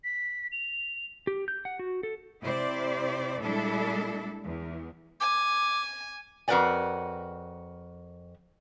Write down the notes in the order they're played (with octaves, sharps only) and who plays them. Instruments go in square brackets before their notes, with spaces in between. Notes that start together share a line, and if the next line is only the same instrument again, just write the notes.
[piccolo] B6
F7
[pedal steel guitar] G4
G6
F#5
F#4
A4
[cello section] C3 E4 C5 D5
A#2 G3 G#3 D4 E4 A4
E2
[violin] G#5 [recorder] D6
[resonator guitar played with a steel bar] F2 F#4 A#4 B4 D5 G#5